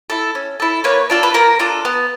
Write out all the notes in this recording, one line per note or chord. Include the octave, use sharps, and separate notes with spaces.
E4 A4
C#4
E4 A4
A#3 B4 C#5
D4 F4 A4
B4
A#3 A#4
D4 F4 A4
B3